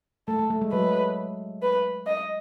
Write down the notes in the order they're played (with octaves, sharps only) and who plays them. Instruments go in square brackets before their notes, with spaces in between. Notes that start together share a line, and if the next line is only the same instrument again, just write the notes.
[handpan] A3 [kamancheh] A4
[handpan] A3
A3
G#3
[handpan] F#3 [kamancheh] B4
[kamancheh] B4
D#5